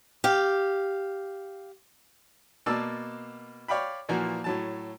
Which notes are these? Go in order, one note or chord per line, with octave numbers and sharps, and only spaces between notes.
G4 F5
B2 A#3 D5 A5 E6
C#5 D5 F5 G5 B5
A#2 E3 F3 A#3 F#4
A2 F#3 A5